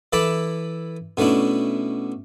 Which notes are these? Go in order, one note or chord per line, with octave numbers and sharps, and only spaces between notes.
E3 E4 A4 A5 B5 D6
B2 A3 C#4 D4 E4